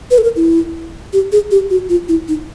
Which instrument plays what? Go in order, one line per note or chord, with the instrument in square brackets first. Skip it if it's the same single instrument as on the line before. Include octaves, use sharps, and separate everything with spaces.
[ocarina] B4
A4
A#4
E4
G4
G#4
G4
F#4
F4
E4
D#4